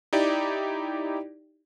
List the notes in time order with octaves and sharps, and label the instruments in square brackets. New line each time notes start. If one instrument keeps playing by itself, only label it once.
[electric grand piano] D#4 E4 G4 D5